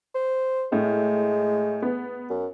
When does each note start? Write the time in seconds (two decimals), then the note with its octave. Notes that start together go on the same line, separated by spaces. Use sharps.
0.15 C5
0.72 A2 G#3
1.82 B3
2.30 F#2